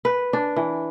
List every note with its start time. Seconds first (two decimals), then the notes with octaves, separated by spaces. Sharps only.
0.05 B4
0.33 D4
0.56 E3